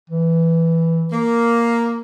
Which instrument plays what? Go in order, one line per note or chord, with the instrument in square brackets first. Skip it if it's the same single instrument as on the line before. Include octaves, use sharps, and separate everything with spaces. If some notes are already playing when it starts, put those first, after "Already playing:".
[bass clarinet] E3
[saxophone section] A#3